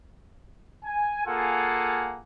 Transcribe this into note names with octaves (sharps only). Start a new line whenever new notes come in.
G#5
A#3 F4 G#4 A4 F#5 G#5